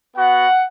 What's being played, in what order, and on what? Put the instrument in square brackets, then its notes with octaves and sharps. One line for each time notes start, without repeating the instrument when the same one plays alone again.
[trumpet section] B3 F#4 F#5